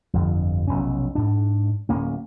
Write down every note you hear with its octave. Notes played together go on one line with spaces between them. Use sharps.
G1 F2
F1 B1 C#4
G#2 D4
D1 A#3 C#4